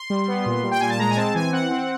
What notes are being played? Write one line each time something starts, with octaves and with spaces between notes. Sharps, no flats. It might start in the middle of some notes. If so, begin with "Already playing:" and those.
Already playing: C6
G3
B3
A#2
G3
G5
A#2 G#5
A5
G#3 A#5
G#5
C4 A5
E3 G#5
C4 F#5
C4